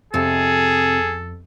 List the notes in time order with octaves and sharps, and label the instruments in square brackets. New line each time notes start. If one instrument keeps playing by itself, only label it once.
[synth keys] F2 [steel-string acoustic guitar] C3 [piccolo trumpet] G#4 [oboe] A4